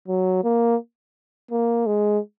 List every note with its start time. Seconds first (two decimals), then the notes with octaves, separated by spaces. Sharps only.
0.08 F#3
0.44 A#3
1.51 A#3
1.86 G#3